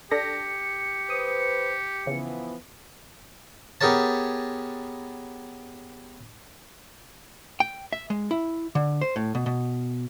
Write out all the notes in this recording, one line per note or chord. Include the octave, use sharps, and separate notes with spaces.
D4 G4 A4 A#6 C#7
B4 C5 D#6
C#3 E3 F3 B3
B3 G4 G#4 A#4 C#5 A5
G5
E5
G#3
E4
D3
C5
A2
B2
B2